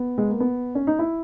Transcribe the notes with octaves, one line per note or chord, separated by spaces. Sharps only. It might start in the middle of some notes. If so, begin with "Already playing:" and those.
Already playing: B3
G#3
A#3
B3
C#4
D#4
E4